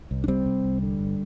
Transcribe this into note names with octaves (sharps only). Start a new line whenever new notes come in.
C2
D4
C3 G3 C4
C3
C2
D3
G1